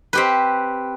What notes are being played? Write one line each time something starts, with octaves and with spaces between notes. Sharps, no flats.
C4 G4 B4